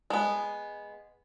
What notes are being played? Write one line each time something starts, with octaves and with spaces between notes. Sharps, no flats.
G#3 B3